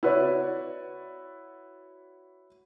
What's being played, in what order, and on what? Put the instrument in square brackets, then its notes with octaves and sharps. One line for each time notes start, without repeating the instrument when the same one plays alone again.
[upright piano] E4 F#4 B4 C#5 D5